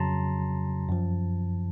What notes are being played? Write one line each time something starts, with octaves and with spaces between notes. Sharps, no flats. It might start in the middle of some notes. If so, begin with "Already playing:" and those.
Already playing: F2 C#3 F#3 A5 A#5 C6
F#2 F3